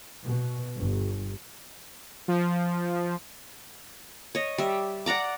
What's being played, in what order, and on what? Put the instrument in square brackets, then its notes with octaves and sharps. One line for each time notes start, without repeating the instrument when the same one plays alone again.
[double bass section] B2
G1
[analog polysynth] F3
[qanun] C#5 D#5
G3 E5
D5 F#5 A#5 D6